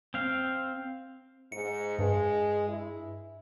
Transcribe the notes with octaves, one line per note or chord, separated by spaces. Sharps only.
C4 F5
G#2 C#7
G2 G#3
E4